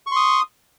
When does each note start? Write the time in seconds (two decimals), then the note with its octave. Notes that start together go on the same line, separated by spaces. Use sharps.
0.07 C#6
0.11 C6
0.16 D#6